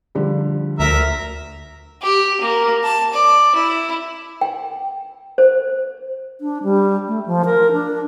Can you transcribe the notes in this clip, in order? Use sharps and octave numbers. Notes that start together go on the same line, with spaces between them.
D3 F3 G3
D2 A#4 E5 A#5
G4
A#3
A5
D5
E4
G5
C5
D4
G3
A3
F3
A#4
D4